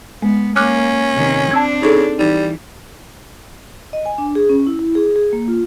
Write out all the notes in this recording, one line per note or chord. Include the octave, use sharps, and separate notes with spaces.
G#3 B3
A#3 C#4 D6 F6 F#6
C3 D#3
C4 D4 A5 E6 G#6
C#3 D#4 G#4 A4
E3 G3 D#4
D#5
G#5
D4
G#4
C#4
E4
E4
G#4
G#4
A#3
F4